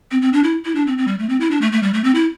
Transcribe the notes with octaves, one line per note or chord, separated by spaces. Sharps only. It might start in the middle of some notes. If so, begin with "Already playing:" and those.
C4
C4
D4
E4
E4
D4
C4
C4
G3
A3
C4
E4
D4
A3
A3
G3
A3
C4
E4